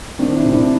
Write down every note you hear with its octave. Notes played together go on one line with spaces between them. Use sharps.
D#3 C4 D4
D4 E4
C3
D4 E4